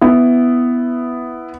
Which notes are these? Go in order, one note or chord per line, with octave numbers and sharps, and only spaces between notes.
B3 E4